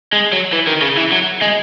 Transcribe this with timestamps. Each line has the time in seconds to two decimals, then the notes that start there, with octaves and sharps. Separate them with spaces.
0.13 G#3
0.33 F#3
0.53 E3
0.67 D#3
0.82 C#3
0.98 E3
1.12 F#3
1.42 G#3